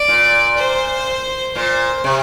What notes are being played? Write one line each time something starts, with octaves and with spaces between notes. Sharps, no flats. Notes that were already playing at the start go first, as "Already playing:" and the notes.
Already playing: D5
A#2
C5
A#2 C5
C3